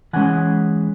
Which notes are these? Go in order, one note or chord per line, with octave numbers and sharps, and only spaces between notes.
E3 G#3 C#4 F#5 G#5